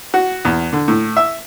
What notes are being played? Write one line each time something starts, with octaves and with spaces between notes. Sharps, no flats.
F#4
E2
D3
A2
E5